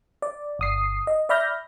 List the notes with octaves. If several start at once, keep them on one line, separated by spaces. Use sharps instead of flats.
D5
G1 D#6 C7
D#5
D5 E5 B5 F6 G6 A#6